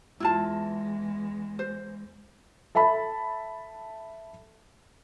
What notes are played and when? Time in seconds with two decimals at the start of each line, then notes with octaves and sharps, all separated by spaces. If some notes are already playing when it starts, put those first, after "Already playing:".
0.20 E2 G#3 E4 F4 A5
1.59 C5
2.75 A4 E5 A5 B5